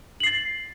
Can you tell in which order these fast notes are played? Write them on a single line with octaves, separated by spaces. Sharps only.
F#7 C7 A6